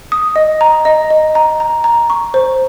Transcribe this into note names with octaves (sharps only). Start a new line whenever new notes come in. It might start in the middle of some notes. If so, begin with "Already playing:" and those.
D#6
D#5
A#5
D#5
D#5
A#5
A#5
A#5
C#6
C5